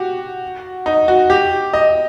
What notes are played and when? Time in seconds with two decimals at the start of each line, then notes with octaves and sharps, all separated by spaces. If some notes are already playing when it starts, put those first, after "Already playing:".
Already playing: F#4 G4
0.86 D#4
1.08 F#4
1.30 G4
1.73 D#5